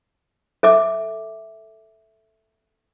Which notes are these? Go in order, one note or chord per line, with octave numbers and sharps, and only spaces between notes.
A4 E5 D6